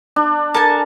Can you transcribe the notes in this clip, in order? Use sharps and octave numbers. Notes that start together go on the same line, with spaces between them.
D4
A4 A#4 G#5 A5